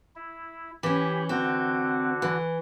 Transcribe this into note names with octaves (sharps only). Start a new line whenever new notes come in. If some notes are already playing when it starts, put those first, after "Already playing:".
E4
E3 C#4 G4 B5
D3 C4 F#4
E3